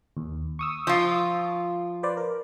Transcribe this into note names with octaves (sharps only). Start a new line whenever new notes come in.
D#2
C#6 D#6 E6
F3 F4
B4 C5 D5
A#4